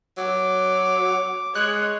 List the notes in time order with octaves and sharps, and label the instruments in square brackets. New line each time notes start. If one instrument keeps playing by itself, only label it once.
[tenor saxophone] F#3 [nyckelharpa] D6
[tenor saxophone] G#3 [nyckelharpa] C#5 [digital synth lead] F#6